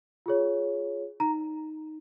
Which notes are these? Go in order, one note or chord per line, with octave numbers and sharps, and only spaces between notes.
F4 G#4 C#5
D#4 A#5